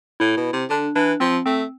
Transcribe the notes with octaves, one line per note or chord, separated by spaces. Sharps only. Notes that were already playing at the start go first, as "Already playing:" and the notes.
A2 E4
B2
C3
D3 D4
E3 D4
F3 C4
A3 C4